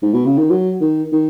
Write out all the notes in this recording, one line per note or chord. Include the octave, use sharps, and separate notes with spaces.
G#2
B2
C#3
D#3
F#3
D#3
D#3